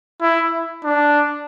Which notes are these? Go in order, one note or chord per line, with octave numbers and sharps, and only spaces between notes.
E4
D4